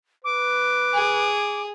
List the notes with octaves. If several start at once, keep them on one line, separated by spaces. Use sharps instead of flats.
B4 D6
G#4